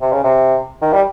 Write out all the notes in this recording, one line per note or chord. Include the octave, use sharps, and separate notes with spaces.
C3
C#3
C3
D#3
G3